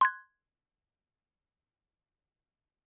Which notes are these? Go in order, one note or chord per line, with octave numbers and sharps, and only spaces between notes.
C6 F#6 G#6